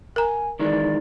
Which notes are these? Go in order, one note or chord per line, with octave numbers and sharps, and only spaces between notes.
A#4 G#5 A#5
D#3 E3 G#3 D5